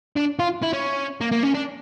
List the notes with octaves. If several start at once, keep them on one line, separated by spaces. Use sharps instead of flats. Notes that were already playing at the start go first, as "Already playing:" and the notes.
D4
F4
E4
C#4
A#3
A#3
C#4
D4